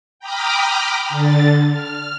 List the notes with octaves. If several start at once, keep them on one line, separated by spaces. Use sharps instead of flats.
G5 A#5 B5 D6 D#6 F6
D3 A6
F6